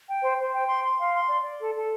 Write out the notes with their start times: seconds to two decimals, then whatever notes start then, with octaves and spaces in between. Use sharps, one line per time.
0.09 G5
0.23 C5
0.39 C5
0.54 G5
0.68 C6
0.83 C6
0.99 F5
1.15 C6
1.29 D5
1.43 D5
1.60 A4
1.74 A4